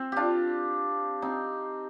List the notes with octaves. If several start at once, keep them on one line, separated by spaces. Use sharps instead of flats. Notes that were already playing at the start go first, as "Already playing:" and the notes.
Already playing: C4
D4 F4 G4
C4 D#4